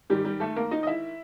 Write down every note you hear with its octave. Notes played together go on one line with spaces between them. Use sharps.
G#2 D#3 G3 G4
G3 G4
A3 A4
A#3 A#4
D#4 D#5
D#5
E4 E5